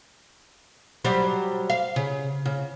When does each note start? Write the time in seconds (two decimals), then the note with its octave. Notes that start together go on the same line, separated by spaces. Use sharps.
1.04 F#3 G3 C5
1.70 F5
1.96 C#3
2.45 C#3